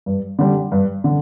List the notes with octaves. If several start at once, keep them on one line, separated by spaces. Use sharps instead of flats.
G2
D3 G3
G2
D3